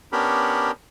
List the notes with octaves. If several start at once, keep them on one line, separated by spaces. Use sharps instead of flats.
B3 C#4 D4 G4 A#4 B5